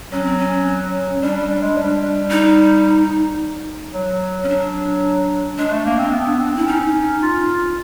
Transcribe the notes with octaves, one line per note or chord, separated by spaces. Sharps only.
F#3 C#4
C4
C#4
G3 D4
G3
G3
G#3
G3
D#4
F#3
C#4
F#3 D4
G#3 D4
A3
A#3
C4
B3
C4
E4
C#4 D#4
F4